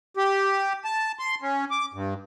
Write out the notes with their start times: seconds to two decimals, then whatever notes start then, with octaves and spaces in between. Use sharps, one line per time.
0.17 G4
0.85 A5
1.19 C6
1.42 C#4
1.71 D6
1.94 G2